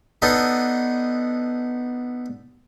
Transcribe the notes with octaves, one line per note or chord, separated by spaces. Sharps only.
B3 D4 D#4 A4